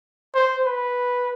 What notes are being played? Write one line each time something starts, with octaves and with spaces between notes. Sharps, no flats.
C5
B4